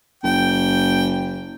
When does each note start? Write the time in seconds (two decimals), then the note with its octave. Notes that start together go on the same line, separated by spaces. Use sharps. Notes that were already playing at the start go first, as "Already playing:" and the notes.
0.24 F#1 G5